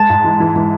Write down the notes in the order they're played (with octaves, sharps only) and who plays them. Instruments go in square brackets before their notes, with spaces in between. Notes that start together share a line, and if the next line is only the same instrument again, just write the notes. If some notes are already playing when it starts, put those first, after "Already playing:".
Already playing: [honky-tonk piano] G#3 [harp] A5
[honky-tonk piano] G#2
E3
E3
E3